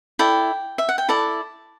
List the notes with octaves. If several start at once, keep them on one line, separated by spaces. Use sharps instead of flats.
E4 A4 D5 G5
E5
F#5
G5
E4 A4 D5 A5